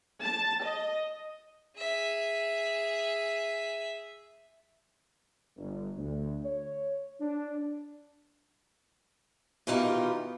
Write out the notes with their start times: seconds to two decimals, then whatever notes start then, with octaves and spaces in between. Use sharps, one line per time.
0.21 A5
0.62 D#5
1.77 G#4 E5
5.57 G1
5.97 D2
6.45 C#5
7.20 D4
9.67 B2 D#3 E3 D#4 F4 G4